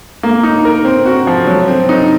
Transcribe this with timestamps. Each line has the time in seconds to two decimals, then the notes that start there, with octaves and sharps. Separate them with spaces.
0.23 A#3
0.43 D#4
0.65 A#4
0.85 C4
1.06 F#4
1.27 F3
1.47 F#3
1.68 C4
1.89 D#4